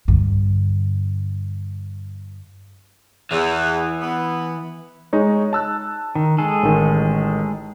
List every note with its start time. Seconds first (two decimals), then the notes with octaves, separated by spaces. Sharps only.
0.08 G2 D3
3.31 E2 E3
4.00 B3
5.13 G#3 D#4 C#5
5.53 A5 E6 F#6
6.15 D#3
6.38 G#3 G#4 A4
6.63 A1 D#3